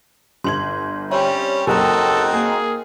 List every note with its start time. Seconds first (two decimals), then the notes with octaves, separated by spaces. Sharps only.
0.44 G1 C6 G#6 F#7
1.11 G3 C4 C#4 C#5 E5
1.67 F#1 C4 D#4 F#4 A4 A#4 G5 A#5
2.33 A#3 G#4